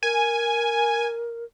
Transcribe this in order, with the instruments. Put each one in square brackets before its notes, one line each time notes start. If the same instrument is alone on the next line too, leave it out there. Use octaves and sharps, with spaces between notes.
[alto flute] A#4 [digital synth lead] G#5